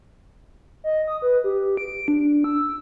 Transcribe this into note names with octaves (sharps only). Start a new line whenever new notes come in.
D#5
D#6
B4
G4
D7
D4
E6